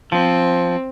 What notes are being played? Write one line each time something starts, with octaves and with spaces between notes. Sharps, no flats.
F3 C4